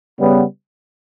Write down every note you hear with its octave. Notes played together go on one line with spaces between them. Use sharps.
C#3 G3 B3